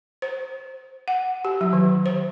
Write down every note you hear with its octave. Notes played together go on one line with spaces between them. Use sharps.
C5
F#5
G4
F#3
D#3
C5